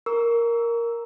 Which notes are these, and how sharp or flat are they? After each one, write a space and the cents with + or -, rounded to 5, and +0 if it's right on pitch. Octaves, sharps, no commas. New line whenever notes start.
A#4 +0 C#6 +40 E6 +0